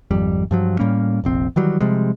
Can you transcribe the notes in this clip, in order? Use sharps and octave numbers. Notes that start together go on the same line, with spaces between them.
G#1 F2 G3
G2 F3 F#3
A2 G3 A#3 C#4
F1 A#1 C4
D#3 E3 F#3 G3
C3 F3 G3 G#3